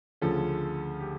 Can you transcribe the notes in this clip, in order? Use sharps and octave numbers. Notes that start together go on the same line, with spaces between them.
D2 C#3 F3 A4
G4